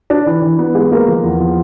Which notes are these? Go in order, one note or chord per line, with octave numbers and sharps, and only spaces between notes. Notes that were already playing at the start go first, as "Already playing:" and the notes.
D4
E3
E3
B3
G#3
A#3
F3
E2
F3